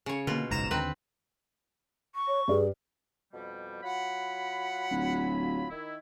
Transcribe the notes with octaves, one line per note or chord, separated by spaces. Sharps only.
C#3 C#5
B2 D3 A#3 F4
F#1 B1 G#2 C#3 A#5 E7
D#2 D3 C4 B4
C#6
C#5
G2 G#4 B4 D5
F2 B2 G3
F#3 F4 F#5 B5
D1
D#3 E4